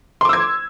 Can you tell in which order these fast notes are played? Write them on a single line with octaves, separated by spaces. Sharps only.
C6 D6 E6 G#6